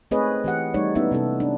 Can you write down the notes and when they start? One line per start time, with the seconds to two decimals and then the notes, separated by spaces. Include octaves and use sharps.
0.11 A3 C4 G#4 B4 C#5 D#5
0.44 E3 G4 F#5
0.74 G3 A3 D#4 C#5 D5
0.95 G#3 B3 C#4 D#4 E4 E5
1.11 C3 B3 D#4 A4
1.40 D4